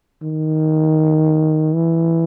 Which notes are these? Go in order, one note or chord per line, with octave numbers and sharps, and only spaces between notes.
D#3
E3